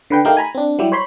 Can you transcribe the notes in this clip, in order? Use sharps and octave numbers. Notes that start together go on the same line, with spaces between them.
D3 B4 G5
A3 D#4 G4 A#4 F5 G5
G#5 A#5 B5
C4 D4
F#3 G3 E4 G4
C5 C#5 B5 C6